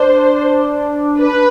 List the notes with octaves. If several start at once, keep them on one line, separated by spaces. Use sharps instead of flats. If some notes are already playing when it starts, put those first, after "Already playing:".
Already playing: D4 C5
B4